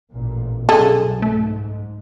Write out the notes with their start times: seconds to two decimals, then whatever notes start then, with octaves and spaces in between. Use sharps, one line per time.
0.10 A1 A#2
0.69 C2 F#2 B2 G#4 A4
1.22 G#2 A3